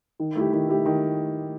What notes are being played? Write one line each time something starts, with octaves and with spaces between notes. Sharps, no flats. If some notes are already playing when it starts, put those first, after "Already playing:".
D#3
A3 E4 G4
D#3
A3 E4 G4
D#3